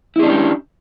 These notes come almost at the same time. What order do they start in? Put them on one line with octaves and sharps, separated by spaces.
E4 G#4 D4 C#4 G4